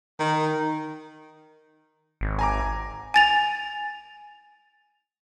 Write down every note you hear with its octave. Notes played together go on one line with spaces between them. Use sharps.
D#3
G#1
G#5 A#5 D6
G#5 A6 F7